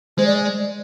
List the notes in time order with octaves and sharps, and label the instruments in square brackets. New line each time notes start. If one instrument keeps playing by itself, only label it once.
[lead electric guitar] G#3 [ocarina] C5
[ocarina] D5